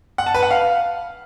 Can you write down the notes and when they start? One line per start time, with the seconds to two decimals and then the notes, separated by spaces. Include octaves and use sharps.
0.18 F#5
0.26 A5
0.35 B4
0.43 F#5
0.51 F5